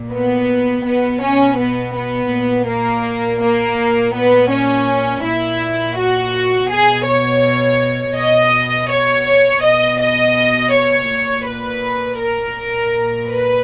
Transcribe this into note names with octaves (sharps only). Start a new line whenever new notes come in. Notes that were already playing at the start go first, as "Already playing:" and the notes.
Already playing: A#2
B3
B2 B3
C#4
B3
B3
A#2
A#3
A#3
A#2
B3
C#4
A#2 E4
F#4
B2 G#4
C#5
B2 D#5
C#5
B2 D#5
D#5
C#5
A#2
B4
A#4
A#2
B4